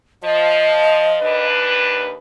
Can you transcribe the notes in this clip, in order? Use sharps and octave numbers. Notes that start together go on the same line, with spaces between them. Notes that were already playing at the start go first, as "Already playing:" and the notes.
F3 D#5
D#2 D4 B4